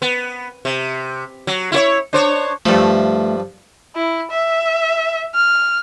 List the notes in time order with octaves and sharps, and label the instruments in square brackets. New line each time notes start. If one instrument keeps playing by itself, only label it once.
[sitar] B3
C3
F#3
E4 F4 C#5
D4 C5 C#5
[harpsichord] G2 F3 [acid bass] A3
[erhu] E4
E5
F6